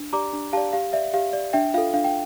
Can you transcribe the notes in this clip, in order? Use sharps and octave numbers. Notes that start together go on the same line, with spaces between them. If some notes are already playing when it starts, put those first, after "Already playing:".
Already playing: D4
G4 D5 A#5 D6
D4
G4 D5 F5 A5
G4 F5
D5 E5
G4 F5
D5
D4 E5 G5
F4 A4 F5
D4 F5
G5